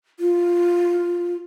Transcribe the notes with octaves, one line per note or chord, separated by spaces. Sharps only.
F4